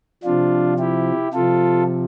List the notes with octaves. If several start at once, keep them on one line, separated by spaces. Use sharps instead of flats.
C3 F3 D4 F4
E4 G4
C3 F3 F4 A4